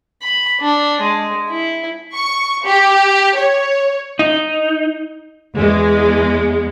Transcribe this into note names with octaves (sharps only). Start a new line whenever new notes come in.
B5
D4
G#3
E4
C#6
G4
C#5
D#4
E2 G#3